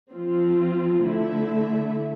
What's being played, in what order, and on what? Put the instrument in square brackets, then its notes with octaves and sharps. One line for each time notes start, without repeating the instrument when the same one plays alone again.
[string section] F3 C4 F4
D3 A3 E4 A4 E5